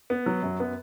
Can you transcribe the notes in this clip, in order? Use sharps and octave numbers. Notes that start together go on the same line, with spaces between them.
B3
F#3
F#2
B3